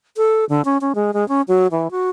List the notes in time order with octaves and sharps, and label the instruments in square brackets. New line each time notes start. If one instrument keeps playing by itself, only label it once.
[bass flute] A4
D3
C#4
C#4
G#3
G#3
C#4
F#3
E3
F#4